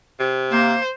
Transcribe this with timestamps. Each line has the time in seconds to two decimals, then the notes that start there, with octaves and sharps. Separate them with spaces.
0.20 C3
0.52 A#3 C5